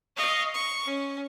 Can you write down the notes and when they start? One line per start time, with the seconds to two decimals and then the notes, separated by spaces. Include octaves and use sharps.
0.16 D#5 F5 C#6
0.53 C#6
0.85 C#4